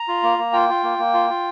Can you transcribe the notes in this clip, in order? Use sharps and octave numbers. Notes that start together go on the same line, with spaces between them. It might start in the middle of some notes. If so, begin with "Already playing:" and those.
Already playing: A#5
F4
A#3
A#3
F4 G5
F4
A#3
A#3
F4
F4